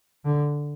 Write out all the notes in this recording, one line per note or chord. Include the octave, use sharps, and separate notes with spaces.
D3